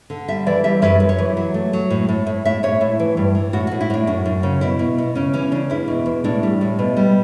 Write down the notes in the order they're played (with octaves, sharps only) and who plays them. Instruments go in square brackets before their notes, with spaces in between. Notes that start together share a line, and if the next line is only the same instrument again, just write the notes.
[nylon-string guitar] D3
G3 E5
E3 D5
G3 E5
F#2 B4
F#2
C#5
E3
F#3
A3
F#3
A2
A2
A2
A2 E5
A2 C#5
A2 E4
E3
G2
E3
A2 F#4
A2 F#4
E4
A2 D4
F#2 F#4
F#2
C#3
B2 E4
B2
B2
C#3 C#4
E3 C#4
C#3 D4
E2 E4
B2
E2
A2 D4
G3
A2
B2
G3